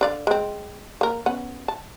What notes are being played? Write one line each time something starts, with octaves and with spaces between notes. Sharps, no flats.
D3 D5 F5
G#3 C4
A#3 A#4
B3 C#4 F#5
A5